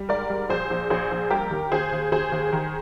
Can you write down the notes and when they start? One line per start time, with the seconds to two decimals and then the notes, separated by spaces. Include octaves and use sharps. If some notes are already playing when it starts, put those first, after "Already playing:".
Already playing: G3
0.09 G#2 A#4 D5
0.30 G3
0.49 A#1 G#4 C5
0.70 A#1
0.90 A#1 G#4 C5
1.11 A#1
1.30 G3 G4 A#4
1.51 D#2
1.71 D#2 G#4 C5
1.92 D#2
2.12 D#2 G#4 C5
2.32 D#2
2.53 D#3